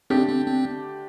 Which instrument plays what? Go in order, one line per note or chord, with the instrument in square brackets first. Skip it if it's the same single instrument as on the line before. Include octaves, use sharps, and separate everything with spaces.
[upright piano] D3 A3 D4 G4 [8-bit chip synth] C4
[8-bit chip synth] C4
C4